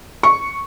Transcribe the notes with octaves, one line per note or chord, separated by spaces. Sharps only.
C#6